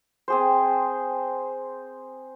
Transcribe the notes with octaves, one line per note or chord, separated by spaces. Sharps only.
C4 G#4 C5